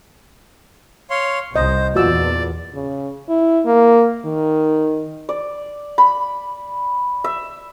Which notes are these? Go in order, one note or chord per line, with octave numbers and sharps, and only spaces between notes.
C#5 F5 C6
C2 C5 D#5
E2 A#2 F4 F#4 D5 E6
C#3
E4
A#3
D#3
D5
B5
E5